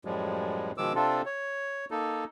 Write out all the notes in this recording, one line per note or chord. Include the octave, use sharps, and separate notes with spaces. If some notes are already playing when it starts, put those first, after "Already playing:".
F#2 A2 F3 G3 G#3
B2 D#3 F3 G#3 D6 E6
C3 C4 D4 F4 A4
C#5
A#3 D#4 A4